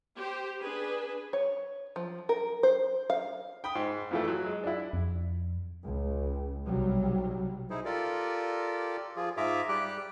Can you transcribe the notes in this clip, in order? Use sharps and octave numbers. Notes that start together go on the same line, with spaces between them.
G4 C5
D4 G#4 B4
C#5
F3
A#4
C5
F5
G5 B5 D#6
G#2 C6
F2 E3 A3
F#3
G#3
D4 E4
F2
C#2
B1 C3 F#3 G3
D#4 E4 G#4 C5
F4 G4 A4 A#4 D5
F3 F4 G#4
G#2 F4 G#4 E5 A#5 D6
G3 G4 G5 D6 F#6